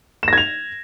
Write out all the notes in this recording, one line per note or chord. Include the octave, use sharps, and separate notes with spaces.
G#6 A#6 E7 F7